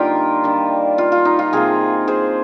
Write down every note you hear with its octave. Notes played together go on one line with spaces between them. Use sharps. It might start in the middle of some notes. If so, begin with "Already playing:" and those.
Already playing: D3 G3 A#3 D#4 F4 G4 A#4
D#3 G3 D4
F4
F4
D#4
F4
C3 F3 A#3 F4 G#4
G#4 C5